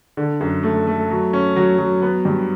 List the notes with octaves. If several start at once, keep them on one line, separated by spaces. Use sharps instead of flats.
D3
F#2
A3
A3
F#3
C#4
F#3
F#3
B3
G2